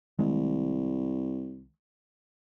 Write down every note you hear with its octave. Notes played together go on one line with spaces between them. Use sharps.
C2 D#3 G#3 A3